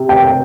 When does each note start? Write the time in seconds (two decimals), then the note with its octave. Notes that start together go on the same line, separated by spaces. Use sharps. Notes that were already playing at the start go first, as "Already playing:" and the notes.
Already playing: C3
0.09 G5